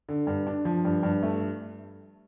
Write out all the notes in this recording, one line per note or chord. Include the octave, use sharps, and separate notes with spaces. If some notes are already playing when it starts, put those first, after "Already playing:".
D3
G2
D4
F3
G2
G2
A3